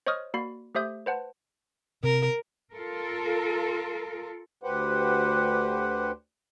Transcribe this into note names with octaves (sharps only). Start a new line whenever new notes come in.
C5 C#5 D#5 C#6 D#6 F6
A#3 F#4 D5 B5 C7
A3 G4 C5 E5 D#6 G6
B4 C5 F#5 A5
C3 A#4
F4 A4 A#4
D2 G4 B4 C5 F#5